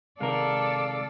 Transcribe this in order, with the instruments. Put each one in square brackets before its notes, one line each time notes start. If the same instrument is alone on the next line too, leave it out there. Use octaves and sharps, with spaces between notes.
[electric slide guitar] C3 D#3 [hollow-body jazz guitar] G#3 A#4 [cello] A4 D5 [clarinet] F5